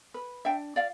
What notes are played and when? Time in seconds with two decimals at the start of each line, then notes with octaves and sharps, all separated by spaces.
0.14 B4
0.45 D4 E5 G5
0.76 F4 D5 F5